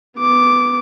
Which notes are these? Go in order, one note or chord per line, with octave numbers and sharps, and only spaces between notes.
B3 D6